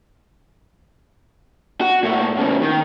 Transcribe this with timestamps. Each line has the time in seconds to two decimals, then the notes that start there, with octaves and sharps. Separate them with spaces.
1.81 F#4
2.03 A#2 A3
2.36 A2 C#3
2.62 D#3